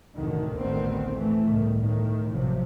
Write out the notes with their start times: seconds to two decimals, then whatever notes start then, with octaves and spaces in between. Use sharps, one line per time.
0.17 F1 D2 A2 D3 D#3
0.55 A1 D2 D3 D#3 B3 C4
1.15 E3 A3
1.46 G1 C#2 A2 D#3
1.78 A2 D#3
2.29 A1 C3 F3 F#3